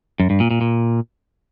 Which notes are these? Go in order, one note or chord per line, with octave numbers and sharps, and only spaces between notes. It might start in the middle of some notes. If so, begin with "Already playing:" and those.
F#2
G2
A#2
A#2
A#2